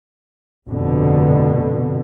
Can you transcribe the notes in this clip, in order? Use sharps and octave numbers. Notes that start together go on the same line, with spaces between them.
F1 G2 B2 D3